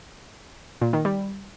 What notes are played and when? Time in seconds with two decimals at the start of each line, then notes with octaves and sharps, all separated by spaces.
0.81 A#2
0.93 D#3
1.05 G3